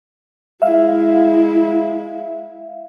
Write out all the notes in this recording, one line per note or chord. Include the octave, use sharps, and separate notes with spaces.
G#3 E4 E5 F5